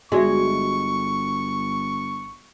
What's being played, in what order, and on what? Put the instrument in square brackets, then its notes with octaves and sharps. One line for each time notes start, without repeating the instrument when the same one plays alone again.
[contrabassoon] G1 [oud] G#3 [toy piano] F#4 D5 E5 [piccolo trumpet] C#6